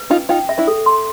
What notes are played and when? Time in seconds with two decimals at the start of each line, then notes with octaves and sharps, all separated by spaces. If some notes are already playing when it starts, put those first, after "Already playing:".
Already playing: B4
0.10 C#4 D#4 F4
0.29 D#4 F4 G5
0.49 E5
0.58 D4 E4
0.68 A4
0.86 C6